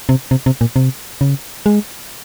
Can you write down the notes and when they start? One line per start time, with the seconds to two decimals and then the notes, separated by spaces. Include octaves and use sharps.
0.09 C3
0.31 C3
0.46 C3
0.61 A#2
0.76 C3
1.21 C#3
1.66 G#3